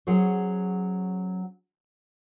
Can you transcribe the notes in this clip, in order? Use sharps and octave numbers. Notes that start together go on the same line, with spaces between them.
F#3 C#4 G#4 C5 C#5